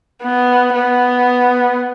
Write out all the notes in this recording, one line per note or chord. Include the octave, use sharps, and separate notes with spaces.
B3
B3